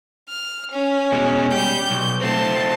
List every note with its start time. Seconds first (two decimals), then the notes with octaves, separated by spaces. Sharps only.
0.29 F6
0.71 C#4
1.12 B2 G#3
1.52 G3 G4 G6
1.91 B1
2.21 A3 C4 A5 C6